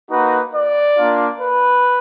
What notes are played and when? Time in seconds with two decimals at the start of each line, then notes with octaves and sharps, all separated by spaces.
0.10 A#3 D#4 F#4 B4
0.54 D5
0.98 A#3 D4 F4
1.40 B4